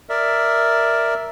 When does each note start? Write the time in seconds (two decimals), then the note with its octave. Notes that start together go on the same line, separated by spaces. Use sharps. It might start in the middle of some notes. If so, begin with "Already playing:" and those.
0.09 A#4 D5 E5